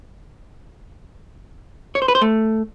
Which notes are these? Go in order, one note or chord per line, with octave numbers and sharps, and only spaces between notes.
C#5
C5
B4
C5
A3